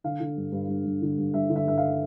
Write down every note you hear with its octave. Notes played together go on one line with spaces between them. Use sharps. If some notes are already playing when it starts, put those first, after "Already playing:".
D3 F5
D3
G2
G2
G2
G2
D3
G2
G2 E5
D3
E5
G2 E5
F5